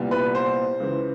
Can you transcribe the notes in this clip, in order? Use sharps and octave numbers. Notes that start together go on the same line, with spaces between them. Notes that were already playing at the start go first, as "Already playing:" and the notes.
Already playing: C2 A#2 G3 B3
B4
C5
C#2 C#3 E3